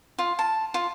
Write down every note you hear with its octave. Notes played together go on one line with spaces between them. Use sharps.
F4
A5
F4